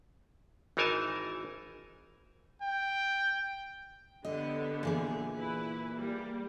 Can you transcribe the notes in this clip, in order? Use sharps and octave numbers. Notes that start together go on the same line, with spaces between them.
G#1 E3 D#4 A#4 G#5 A5
G5
D3 B3 G4 D#5
A#2 E3 G#4
E4 B4
G3 A#3